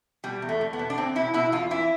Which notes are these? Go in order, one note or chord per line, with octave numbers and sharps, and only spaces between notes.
B2 G3
E2
A3
E2
B3
B2
D4
E2 C4
B2 E4
B2 E4
E2 F4
E3 E4